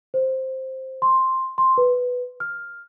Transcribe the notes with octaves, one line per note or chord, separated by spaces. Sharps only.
C5
C6
C6
B4
F6